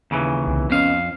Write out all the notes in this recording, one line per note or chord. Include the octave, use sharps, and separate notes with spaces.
D#2 C#3 E3
C2
F2 B3 C#4 D#5 F5